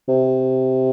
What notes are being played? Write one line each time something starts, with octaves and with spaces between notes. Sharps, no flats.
C3